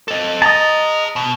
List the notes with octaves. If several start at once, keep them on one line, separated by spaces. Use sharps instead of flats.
A4 D#5
G#4 D#5 A5 A#5
B2